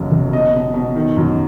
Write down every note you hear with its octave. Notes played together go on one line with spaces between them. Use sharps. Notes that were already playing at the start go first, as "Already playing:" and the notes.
Already playing: F#1 B1 F#2
F#1
B2 D#5
B2
B2
D#3
F#2